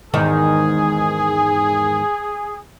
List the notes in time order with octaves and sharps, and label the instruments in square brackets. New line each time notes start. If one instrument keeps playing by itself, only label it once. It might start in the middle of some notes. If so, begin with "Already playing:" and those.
[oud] E2 G#2 D#3 [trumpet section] G#4